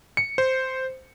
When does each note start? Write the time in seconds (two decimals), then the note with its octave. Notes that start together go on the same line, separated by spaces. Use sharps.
0.17 C#7
0.38 C5